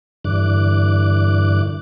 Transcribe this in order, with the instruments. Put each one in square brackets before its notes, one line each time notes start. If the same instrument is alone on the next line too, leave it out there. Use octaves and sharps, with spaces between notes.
[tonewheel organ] G2 D3 E3 D6 F#6